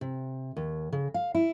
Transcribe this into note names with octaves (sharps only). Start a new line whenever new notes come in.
C3
D#2
C#3
F5
E4